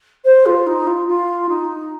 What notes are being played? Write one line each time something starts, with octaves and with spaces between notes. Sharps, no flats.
C5
F4
D#4
F4
F4
D#4